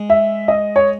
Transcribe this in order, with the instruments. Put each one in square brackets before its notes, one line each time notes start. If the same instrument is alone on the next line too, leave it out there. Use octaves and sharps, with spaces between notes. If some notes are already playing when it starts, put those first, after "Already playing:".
Already playing: [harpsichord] G#3
[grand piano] E5
D#5
C#5